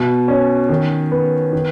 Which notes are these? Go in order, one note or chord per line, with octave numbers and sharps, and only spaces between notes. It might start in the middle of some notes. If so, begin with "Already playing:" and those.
Already playing: B2
C#4
D#3
B3
D#3